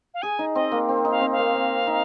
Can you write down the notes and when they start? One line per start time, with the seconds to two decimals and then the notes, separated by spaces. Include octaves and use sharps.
0.14 F5
0.22 G#4 G#5
0.39 D#4
0.55 C4 D#5
0.72 A#3
0.89 C4
1.05 D#4
1.11 F5
1.21 C4
1.32 F5
1.38 A#3
1.55 C4
1.87 D#4